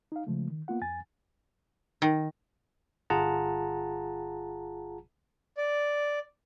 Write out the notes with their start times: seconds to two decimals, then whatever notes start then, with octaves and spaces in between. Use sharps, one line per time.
0.12 D#4 F5
0.27 C#3 F3 G#3 A3
0.50 D#3
0.68 A#3 B3 F4 F#5
0.82 F2 G#5 A6
2.02 D#3
3.10 G1 F4 G#4 F#5 A5 A#5
5.57 D5